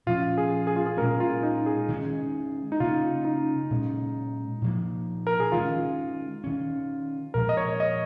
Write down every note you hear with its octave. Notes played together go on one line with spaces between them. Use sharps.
A#2 F3 C#4 F4
G#4
G#4
F4
G#4
A#2 G#3 C#4 A#4
F4
D#4
G#4
D#3 G#3 C#4
D#4
C#3 A#3 C#4 F4
D#4
A#2 G#3 C#4
A#2 F3 A#3
A#4
G#4
D#3 G#3 C#4 F4
D#3 C#4
A#2 F3 G#3 A#4
D#5
C#5
D#5